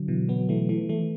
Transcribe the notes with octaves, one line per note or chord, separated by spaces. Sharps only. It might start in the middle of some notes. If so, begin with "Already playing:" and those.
Already playing: D3 F#3
B2 E3
F#3 B3
E3 A3
E3 A3
E3 A3